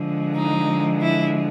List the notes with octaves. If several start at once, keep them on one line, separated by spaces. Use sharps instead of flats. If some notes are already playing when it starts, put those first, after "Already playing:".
Already playing: D3 F3 G#3
D#4
E4